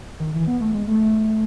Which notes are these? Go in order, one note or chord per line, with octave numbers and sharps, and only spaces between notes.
D#3
E3
B3
A3
G#3
A3